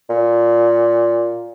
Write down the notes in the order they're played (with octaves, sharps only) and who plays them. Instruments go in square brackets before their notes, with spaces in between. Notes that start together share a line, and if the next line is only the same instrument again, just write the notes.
[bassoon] A#2